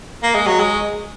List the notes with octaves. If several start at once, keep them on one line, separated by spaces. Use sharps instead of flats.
A#3
G#3
F#3
G#3